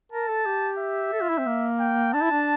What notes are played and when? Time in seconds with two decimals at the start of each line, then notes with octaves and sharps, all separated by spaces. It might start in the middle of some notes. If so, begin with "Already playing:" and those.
0.12 A#4 A5
0.29 A4
0.46 G4
0.79 E5
1.13 A4
1.22 F4
1.29 E4
1.38 C4
1.46 A#3
1.80 G5
2.13 D4 A5
2.22 E4
2.31 D4